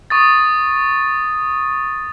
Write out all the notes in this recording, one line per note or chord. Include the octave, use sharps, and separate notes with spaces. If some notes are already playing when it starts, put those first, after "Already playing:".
C#6 D#6 A6